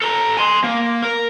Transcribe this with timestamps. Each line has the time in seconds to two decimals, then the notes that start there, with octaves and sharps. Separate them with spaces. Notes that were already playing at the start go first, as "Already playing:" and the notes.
0.02 A4 A#5
0.37 G#5 C6
0.64 A#3
1.02 A#4